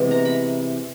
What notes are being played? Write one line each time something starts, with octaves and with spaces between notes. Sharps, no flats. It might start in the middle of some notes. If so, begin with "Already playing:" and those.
Already playing: C3 E3 G#3 B3
A#5
B5